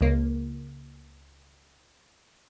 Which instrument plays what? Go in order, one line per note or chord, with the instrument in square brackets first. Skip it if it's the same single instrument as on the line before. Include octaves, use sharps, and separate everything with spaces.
[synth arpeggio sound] C#2 A#3